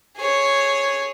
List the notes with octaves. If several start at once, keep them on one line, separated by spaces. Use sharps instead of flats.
G#4 C#5